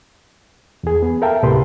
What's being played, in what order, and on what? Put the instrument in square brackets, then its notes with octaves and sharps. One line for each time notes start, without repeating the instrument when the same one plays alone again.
[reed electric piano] E2 G#4
B3
A4 A#4 E5 F5 G5 A5
D2 A2 C3 G4 B4 C6